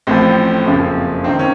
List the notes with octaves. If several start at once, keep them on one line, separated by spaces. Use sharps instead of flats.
A1 A2 F3 C4
F#1 F2 C#3 F3
C#2 C3 D#3 C4
C#4